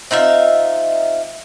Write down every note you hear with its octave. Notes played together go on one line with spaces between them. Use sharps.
C4 D#4 F4 E5